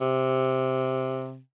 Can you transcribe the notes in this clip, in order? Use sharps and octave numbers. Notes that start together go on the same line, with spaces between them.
C3